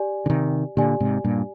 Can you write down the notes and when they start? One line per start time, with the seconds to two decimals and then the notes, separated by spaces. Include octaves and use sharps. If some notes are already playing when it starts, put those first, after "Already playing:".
Already playing: G4 D5 G#5
0.26 D3
0.30 C3 D#3
0.77 A#2 D3 G4 D5 G#5
1.00 G#2 C3
1.24 G2 A#2